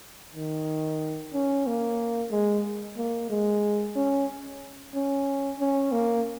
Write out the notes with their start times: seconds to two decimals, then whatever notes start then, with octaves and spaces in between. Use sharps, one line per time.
0.35 D#3
1.34 C#4
1.67 A#3
2.31 G#3
2.97 A#3
3.30 G#3
3.96 C#4
4.95 C#4
5.59 C#4
5.92 A#3